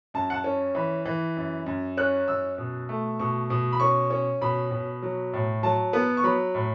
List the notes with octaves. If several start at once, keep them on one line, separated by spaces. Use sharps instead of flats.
F#2 A5
F#5
A5
C#4
E3 B5
E3
F#2
F#2
C#4 F#6
F#2 E6
B2
A3
B2 C#6
B2
B5
C#4 C#6
C#4
B2 B5
B2
F#3
A2
F#3 A5
B3
C#6
F#3 B5
A2